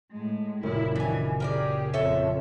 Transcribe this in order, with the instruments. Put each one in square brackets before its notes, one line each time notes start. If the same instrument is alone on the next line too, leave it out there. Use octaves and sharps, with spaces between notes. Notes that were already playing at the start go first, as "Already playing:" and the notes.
[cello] A2 G#3
[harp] F#1 A#2 [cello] E4
[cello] D#3 E3 [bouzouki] D4 G#5
[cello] G4 G#4 [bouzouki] A#4 B4 D5
[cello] F2 [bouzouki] A4 C#5 E5